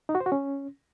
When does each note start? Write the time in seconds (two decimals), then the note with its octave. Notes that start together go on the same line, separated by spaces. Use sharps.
0.09 D#4
0.15 F#4
0.20 C5
0.26 F#4
0.32 C#4